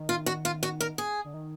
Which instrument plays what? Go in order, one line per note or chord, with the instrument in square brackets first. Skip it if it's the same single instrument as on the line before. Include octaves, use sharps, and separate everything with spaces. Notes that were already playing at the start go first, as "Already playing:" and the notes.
Already playing: [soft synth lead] D#3
[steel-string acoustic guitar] F4
F#4
F4
F#4
A#4
G#4
[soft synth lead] D3
D#3